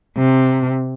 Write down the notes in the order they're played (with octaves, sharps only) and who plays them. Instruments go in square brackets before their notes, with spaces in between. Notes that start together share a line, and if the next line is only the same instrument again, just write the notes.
[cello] C3